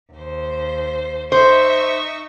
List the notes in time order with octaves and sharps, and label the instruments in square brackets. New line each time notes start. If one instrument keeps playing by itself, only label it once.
[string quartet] D#2 C5
[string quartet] D#4 E5 C#6 [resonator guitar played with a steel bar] C5